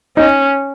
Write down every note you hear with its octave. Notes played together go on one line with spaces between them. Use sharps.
C#4 D#4